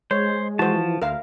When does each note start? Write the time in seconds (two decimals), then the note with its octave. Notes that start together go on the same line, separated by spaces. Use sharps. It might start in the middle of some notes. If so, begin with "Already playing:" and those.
0.11 G#3 C5 C#5
0.59 E3 F3 F#4 C5 A5
1.02 D2 A#4 E5 F5